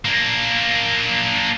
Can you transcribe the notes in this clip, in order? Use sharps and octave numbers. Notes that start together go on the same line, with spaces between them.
A#3 D4